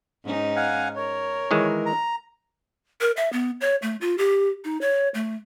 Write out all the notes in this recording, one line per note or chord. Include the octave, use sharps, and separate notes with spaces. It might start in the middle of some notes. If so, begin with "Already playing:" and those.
G#2 C#4 D#4
F5 F#5 G#5
A#4 C#5
D#3 E3 G#3
A#5
A#4
E5
B3
C#5
A3
F4
G4
D#4
C#5
A3